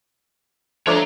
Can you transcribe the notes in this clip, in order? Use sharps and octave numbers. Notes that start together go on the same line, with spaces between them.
F3 A3 D4 C#5 A#5